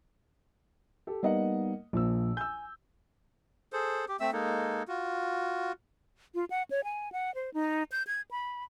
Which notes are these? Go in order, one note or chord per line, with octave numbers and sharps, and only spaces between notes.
G4 A4
G3 A#3 B3 D#4 D#5 F#5
A#1 A#2 F3 A#3 E6
G#5 E6 G6
G#4 A4 C5
G4
A3 C4 E5 E6
G#3 A#3 D#4 A4
F4 F#4
F4
F#5
C#5
G#5
F#5
C5
D#4
G6
G#6
B5